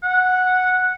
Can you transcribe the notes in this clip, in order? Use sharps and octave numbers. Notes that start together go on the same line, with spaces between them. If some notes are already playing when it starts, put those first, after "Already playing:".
F#5